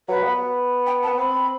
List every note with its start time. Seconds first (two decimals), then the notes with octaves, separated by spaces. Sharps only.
0.08 F#3 B4
0.23 B3
0.86 G5
1.03 A5
1.07 B3
1.18 C4 B5